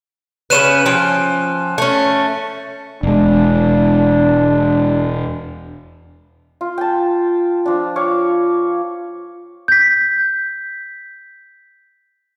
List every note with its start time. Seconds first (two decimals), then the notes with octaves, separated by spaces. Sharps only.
0.50 C#3 C#4 B4 F#6 D#7 E7
0.86 F3 C#4 G5
1.78 A3 C#4
3.03 E1 G#3 D4
6.61 F4
6.78 G5 A5
7.66 F3 D4
7.96 C#5 F5 D6
9.68 G6 B6